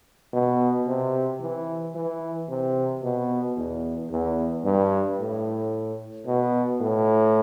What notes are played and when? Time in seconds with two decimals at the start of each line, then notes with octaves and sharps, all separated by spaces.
0.33 B2
0.87 C3
1.41 E3
1.95 E3
2.49 C3
3.02 B2
3.57 E2
4.11 E2
4.64 G2
5.19 A2
6.26 B2
6.80 A2